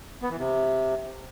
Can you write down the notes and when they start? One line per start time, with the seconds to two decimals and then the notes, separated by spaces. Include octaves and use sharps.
0.22 B3
0.30 E3
0.39 C3